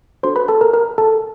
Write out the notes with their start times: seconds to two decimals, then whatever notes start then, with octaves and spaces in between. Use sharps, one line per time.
0.23 D4 F#4 A4 C5 C6
0.36 B4 B5
0.48 A4 A5
0.61 A#4 A#5
0.73 A#4 A#5
0.98 A4 A5